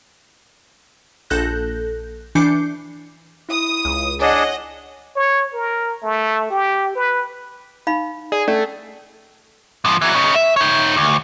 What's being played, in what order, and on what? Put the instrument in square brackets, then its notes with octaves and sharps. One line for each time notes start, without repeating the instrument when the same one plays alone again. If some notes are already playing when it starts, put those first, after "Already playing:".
[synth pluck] A#1 A4 F#6 G6 A#6
E3 D4 D6 G6 C7 C#7
[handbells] E4 [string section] D#6
[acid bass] C#2
[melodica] D4 G#4 A5 [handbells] C#5 [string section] D#5 F#5
[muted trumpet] C#5
A#4
A3
G4
B4
[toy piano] D#4 F5 B5
[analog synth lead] G#4 [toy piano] D5
[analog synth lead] A3 [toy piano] C#4 D4 D5
[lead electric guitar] G#2 F3
E3 F#3
C#4 D#4
E5
D#4 C#5
D2